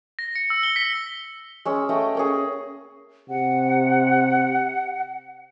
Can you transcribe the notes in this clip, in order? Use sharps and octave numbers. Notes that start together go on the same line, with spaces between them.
A#6
C#7
E6
G7
B6
G#3 C#4 E6
A3 D#5 G5 C#6
A#3 C#4 G#4
C3 F#5